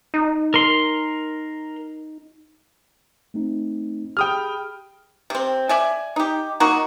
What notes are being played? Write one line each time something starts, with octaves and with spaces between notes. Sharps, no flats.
D#4
A#4 C6
A3 C4 D#4
G4 G#4 G5 B5 D#6 F6
C3 C4
D5 E5 G#5
D#4 G4
F#3 A#3 D#4 F#4